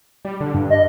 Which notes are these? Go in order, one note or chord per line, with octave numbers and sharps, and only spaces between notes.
G3
D3
G2
D#5